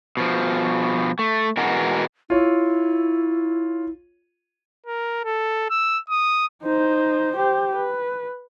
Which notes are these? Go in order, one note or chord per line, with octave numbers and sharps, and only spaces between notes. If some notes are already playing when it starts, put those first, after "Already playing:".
B2 F3
A3
B2 E3 G#3 B3 F#4 A#4
E4 F4 C#5
A#4
A4
E6
D#6
D#4 C5
G4 C5
B4